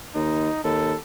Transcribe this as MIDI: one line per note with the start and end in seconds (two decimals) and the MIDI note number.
0.15 0.49 39
0.15 0.61 63
0.64 0.94 39
0.64 0.98 69